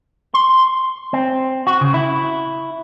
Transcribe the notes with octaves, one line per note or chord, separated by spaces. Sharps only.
C6
C4
F#4
C#3
E4